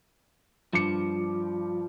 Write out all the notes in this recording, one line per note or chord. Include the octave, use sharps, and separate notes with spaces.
G2 F3 D6 C#7